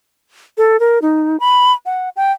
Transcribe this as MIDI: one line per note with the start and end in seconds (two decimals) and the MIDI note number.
0.57 0.79 69
0.80 0.99 70
1.02 1.37 63
1.40 1.72 83
1.86 2.09 78
2.16 2.32 79